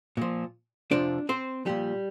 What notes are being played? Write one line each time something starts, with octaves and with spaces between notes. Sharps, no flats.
A#2 F3
F2 C3 F3 D4 D5
C4 C5
A#2 F3 G3 G4